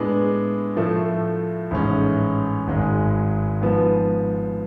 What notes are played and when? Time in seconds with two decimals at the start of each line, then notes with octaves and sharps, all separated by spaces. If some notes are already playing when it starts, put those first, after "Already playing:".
Already playing: A2 G#3 B3 D4
0.76 A2 F3 A3
1.71 A1 G#2 G#3 C#4
2.67 G#1 G#2 G#3
3.62 G#2 F3 B3